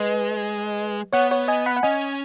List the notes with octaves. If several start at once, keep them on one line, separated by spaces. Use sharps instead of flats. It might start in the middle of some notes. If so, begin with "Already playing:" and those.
Already playing: G#3 B4 D#5
B3 C#5 F#5
C#5 F#5
D#5 G#5
F#5 B5
F#5
C#4 D#5 G#5